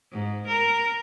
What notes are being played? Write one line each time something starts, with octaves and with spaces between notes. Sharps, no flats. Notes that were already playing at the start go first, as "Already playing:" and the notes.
G#2
A#4